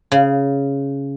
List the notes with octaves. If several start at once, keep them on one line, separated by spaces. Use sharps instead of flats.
C#3